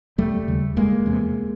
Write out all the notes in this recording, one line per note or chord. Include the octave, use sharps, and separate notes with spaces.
E1 G3 A3
D#2 C#3
F1 G#3 A#3
E2 C3